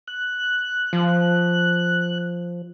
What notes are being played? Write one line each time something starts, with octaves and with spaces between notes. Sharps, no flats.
F#6
F3